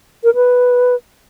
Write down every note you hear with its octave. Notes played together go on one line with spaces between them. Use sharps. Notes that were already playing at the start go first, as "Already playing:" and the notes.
A#4
B4